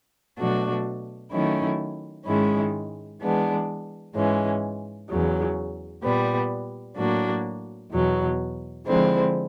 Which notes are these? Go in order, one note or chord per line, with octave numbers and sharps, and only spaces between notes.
B2 F#3 A3 D4 F#4
D#3 F#3 A3 C#4 E4
G#2 D#3 G#3 C#4 E4
E3 G#3 B3 D4
G#2 E3 G#3 C#4
E2 C#3 F#3
A#2 G3 B3
A2 F#3 A#3 D4 F#4
E2 B2 F#3
D3 F3 G#3 C4 E4